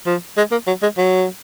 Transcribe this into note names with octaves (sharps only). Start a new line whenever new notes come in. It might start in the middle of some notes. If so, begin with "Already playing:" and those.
F3
G#3
A#3
F#3
G#3
F#3